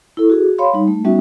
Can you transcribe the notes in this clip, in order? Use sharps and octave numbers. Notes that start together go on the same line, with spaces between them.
E4 A4
F#4 G#4
C#5 F5 B5 C6
G3 D#4
A3
G3 B3 C#4 D#4 F#4 E5